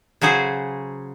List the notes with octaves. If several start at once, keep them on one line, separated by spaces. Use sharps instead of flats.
C#3 F#3 F#4 G#4 C5